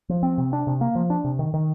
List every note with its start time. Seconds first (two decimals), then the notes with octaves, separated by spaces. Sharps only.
0.09 F3
0.23 C4
0.38 C3
0.53 D4
0.67 C3
0.81 A#3
0.95 F3
1.10 D4
1.24 C3
1.39 D#3
1.54 D#3